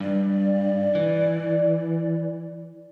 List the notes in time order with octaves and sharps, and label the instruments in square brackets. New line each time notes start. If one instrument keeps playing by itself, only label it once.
[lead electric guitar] G2 [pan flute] D5
[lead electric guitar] E3